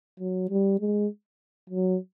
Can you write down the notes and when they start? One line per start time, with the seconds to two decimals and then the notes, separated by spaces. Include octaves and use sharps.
0.20 F#3
0.50 G3
0.80 G#3
1.70 F#3